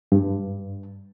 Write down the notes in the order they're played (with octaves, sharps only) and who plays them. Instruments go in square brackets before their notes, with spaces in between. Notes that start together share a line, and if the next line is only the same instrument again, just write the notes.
[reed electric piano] G2